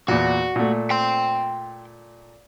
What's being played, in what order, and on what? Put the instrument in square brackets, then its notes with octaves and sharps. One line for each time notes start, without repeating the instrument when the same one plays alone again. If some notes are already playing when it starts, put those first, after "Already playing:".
[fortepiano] E2 A#2 [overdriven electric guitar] F#4
[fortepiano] A#2 A3
[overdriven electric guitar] G5 C6